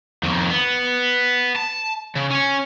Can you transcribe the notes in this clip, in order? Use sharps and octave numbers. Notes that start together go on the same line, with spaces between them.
F2 D#3
B3
A5
C#3
C#4 C#5